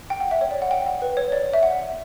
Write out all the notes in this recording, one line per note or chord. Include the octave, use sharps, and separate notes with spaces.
G5
F#5
E5
C#5
D5
F#5
G5
F#5
B4
C#5
D5
E5
F#5